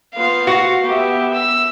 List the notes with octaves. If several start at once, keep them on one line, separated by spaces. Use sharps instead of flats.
B3 F4 C5 F5
F#4
B3 G4 E5
E6